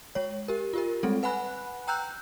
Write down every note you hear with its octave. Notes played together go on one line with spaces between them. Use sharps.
G#3 C#5
G4 A#4
F4 G4 A#4
G3 G#3 C4 A4
B4 F#5 G#5 B5 F#6
G5 A#5 E6 F#6 G6